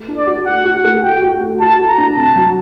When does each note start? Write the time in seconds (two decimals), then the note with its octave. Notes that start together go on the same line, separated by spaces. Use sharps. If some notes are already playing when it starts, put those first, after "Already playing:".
Already playing: A3
0.08 D4
0.17 D5
0.26 F#4
0.46 F#4 F#5
0.64 F#4
0.74 F#5
0.84 A3
1.03 F#4 G5
1.22 F#4
1.41 F#4
1.60 F#4 A5
1.79 F#4
1.88 A#5
1.98 D4
2.16 C3 A5
2.36 F#3